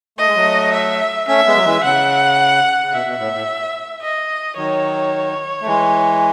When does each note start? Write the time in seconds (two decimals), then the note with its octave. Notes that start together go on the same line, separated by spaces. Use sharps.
0.18 A3 D#5
0.27 G#3
0.36 F#3 A3
0.73 E5
1.28 A3 C#4 E5
1.46 G#3 B3
1.56 F#3
1.65 E3 G#3
1.83 C#3 F#5
2.83 C#3
2.93 B2 E5
3.06 B2
3.19 A2
3.34 A2
4.02 D#5
4.57 D#3 F#3 C#5
5.61 A3
5.66 E3 G#3